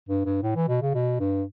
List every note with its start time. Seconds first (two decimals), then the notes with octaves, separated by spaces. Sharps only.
0.09 G2
0.25 G2
0.43 A2
0.55 E3
0.68 B2
0.81 C#3
0.94 B2
1.20 G2